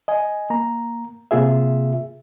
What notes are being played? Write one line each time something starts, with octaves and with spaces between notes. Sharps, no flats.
D#5 G#5
A#3 A#5
C3 A#3 F4 G#4 E5